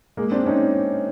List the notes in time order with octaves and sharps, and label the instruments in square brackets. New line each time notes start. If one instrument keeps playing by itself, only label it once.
[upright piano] G#3 A#3
C4 D4
C#4 D#4